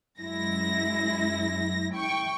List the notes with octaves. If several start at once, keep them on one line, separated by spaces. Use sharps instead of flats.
F#2 G#3 E4 A#6
G5 C#6